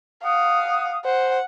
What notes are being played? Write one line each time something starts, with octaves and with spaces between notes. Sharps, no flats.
F5 F#5 D#6
C5 F#5